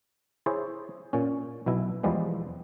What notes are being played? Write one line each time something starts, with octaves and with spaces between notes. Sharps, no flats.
E4 G#4 C5 C#5
A#2 C#4
B1 B2 E4
E2 F3 G3 G#3 B3